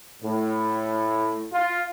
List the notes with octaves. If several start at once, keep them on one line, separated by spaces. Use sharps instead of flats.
A2
F4